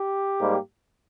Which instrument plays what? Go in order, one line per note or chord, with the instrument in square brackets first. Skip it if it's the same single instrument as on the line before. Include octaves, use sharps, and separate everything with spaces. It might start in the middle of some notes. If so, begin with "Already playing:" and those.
Already playing: [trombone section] G4
G#2 G3 A#3